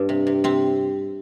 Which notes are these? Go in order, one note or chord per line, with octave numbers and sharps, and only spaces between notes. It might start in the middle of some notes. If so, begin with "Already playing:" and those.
Already playing: G2
C3
C3
C3 C4